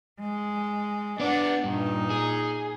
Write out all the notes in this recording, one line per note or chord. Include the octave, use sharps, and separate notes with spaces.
G#3
B3 D4 D5 F#5
G2 A#2 D#4
G#4